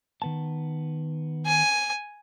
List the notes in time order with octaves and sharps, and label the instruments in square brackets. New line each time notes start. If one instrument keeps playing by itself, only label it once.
[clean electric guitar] D#3 B3 A5
[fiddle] G#5